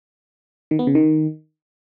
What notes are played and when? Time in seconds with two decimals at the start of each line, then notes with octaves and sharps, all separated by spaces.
0.71 D#3
0.79 B3
0.87 C#3
0.95 D#3